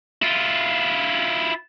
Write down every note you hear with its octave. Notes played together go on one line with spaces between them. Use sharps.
E4 F4